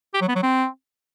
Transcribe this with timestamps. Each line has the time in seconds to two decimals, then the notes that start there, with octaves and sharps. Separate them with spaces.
0.14 G4
0.21 F#3
0.28 B3
0.35 F#3
0.43 C4